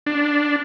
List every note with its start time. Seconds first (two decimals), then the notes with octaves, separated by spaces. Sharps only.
0.06 D4